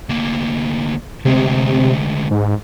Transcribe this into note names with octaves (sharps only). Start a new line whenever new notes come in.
D2 A#3
D2 C3 G#3
G#2